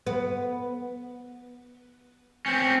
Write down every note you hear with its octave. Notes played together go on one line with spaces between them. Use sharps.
B3
C4 C#4